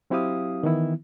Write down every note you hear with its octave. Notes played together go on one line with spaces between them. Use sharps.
F#3 C4 E4 G4 F5 D#6
D#3 E3 B3 E4